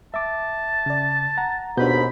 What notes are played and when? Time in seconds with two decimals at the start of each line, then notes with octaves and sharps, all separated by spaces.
0.14 E5 A5 D6
0.86 C#3 D5
1.37 F#5 A#5
1.77 D#2 G#2 B2 B3 D4 F#4 B5 G6